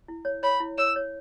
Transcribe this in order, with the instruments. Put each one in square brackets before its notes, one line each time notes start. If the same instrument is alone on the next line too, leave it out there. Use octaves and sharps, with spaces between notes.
[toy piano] E4
C#5
[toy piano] C#5 [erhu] B5
[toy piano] E4
[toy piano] C#5 [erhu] E6
[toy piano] C#5